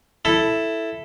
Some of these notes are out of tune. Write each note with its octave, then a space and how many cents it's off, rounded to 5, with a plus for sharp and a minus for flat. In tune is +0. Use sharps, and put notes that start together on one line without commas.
E4 +0 A4 +0